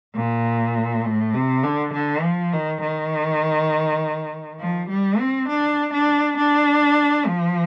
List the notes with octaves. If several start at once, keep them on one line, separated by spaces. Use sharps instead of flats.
A#2
A2
C3
D3
D3
F3
D#3
D#3
F3
G3
C4
D4
D4
D4
F3